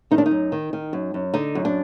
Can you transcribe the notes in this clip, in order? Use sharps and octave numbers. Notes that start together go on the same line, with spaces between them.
D#3 D#4
D4
D#4
F#2
D#3
D#3
F#2
F#2
D3 D#4
F#2
D4